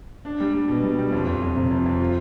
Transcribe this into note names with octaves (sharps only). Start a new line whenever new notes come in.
D4
G3
G3
B2
G3
G3
F2
F2
F2
C3
F2
F2
F4